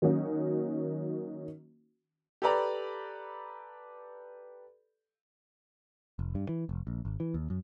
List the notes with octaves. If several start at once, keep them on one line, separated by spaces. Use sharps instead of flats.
D#3 F#3 A#3 C#4 D#4 F#4
G4 A4 B4 D5 A#5 B5
F1
G2
E3
F1
A#1
G#1
E3
D#2
F#2